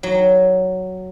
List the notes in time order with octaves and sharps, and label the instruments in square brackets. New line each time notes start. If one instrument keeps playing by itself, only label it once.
[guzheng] F#3